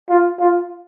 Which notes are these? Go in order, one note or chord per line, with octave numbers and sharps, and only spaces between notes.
F4
F4